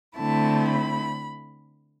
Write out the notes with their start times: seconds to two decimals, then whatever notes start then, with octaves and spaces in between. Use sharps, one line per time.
0.17 D3 A3 C4 E4 A5
0.68 B5